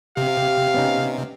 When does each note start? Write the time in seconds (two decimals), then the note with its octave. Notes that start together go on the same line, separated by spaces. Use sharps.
0.17 C3 G4 F5
0.74 B3 C#4 D#4